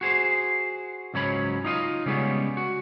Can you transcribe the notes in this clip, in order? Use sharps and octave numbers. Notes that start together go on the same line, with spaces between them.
F#4 G#4 C5
C#2 G#2 F#3 C#4 C#5 B5
D#4 F4 D#5
C#3 G3 G#3 A#3 B3 C#4
F#4